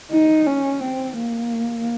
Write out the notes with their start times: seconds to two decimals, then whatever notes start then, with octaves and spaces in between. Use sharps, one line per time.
0.11 D#4
0.47 C#4
0.83 C4
1.18 A#3